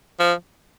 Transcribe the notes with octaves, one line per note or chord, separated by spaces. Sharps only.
F3